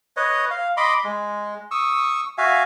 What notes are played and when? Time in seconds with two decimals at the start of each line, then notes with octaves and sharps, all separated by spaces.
0.17 B4 C#5 D#5
0.51 F5
0.77 D#5 B5 C6 D6
1.04 G#3
1.71 C#6 D#6 E6
2.38 F#4 E5 F5 G#5